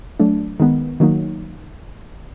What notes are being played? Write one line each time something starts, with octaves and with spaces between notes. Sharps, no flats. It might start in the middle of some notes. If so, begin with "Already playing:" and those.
F#3 A3 D4
D#3 G#3 B3
D#3 F#3 A#3 D#4